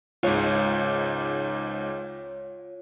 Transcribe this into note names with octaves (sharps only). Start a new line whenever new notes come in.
C#2 G#2 F4 C#5